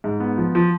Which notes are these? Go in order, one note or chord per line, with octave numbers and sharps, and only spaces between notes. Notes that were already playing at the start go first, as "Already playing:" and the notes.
G#2
B3
F3
F3